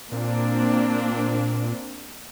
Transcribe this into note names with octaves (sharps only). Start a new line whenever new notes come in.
A#2 A#3 C4 D4